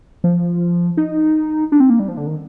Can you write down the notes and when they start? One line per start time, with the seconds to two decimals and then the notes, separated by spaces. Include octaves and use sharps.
0.24 F3
0.97 D#4
1.72 D4
1.80 C4
1.90 A#3
2.00 G3
2.08 F3
2.17 D3
2.27 D#3